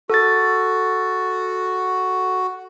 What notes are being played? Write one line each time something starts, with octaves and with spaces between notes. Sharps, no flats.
F#4 A4 A6